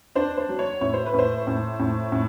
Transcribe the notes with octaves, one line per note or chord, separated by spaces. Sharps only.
D4 C5
C5
F#3
C#5
A2 C#5
C5
B4
A2 C5
A2
A2
A2